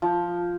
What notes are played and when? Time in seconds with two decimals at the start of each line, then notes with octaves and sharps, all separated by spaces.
0.02 F3